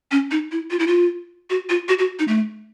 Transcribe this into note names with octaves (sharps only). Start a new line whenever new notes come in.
C#4
D#4
E4
F4
E4
F4
F#4
F4
F#4
F#4
D#4
A3